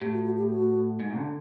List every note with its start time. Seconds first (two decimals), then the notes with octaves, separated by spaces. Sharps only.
0.01 A2 G4
0.14 F#4
0.25 F#4
0.38 G4
0.50 F#4
1.00 G#2
1.17 D3